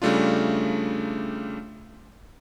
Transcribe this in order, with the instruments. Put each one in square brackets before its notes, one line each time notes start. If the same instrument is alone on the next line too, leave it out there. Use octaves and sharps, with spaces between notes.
[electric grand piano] C#3 G3 A3 D4 F4